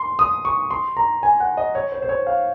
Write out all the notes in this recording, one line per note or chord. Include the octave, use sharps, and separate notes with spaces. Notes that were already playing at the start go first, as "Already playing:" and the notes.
Already playing: C6
D#6
C#6
C6
A#5
G#5
F#5
D#5
C#5
C5
C5
C#5
F5